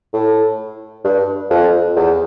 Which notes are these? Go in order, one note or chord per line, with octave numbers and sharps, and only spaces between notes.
A2
G2
F2
E2